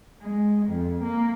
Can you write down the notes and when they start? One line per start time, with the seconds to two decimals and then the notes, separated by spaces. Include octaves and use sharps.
0.21 G#3
0.66 F2
1.03 A#3